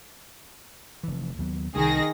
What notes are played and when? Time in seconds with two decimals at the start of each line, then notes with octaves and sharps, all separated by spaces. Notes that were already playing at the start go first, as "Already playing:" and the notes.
1.03 F1 E3
1.39 D#2 F#3 B3
1.76 C2 D#3 G#4 A#6